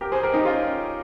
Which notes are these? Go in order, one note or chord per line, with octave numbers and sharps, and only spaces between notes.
G4 A#4
G#4 C5
G4 A#4
D#4 G4
C#4 F4